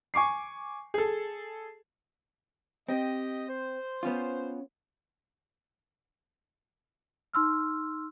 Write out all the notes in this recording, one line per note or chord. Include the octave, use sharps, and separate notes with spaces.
G#5 C#6 D6 C7
G#4 A4
C4 G4 D#5
C5
B3 C#4 F4
D#4 C6 E6 F6